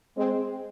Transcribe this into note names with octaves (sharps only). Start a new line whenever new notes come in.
G#3 C4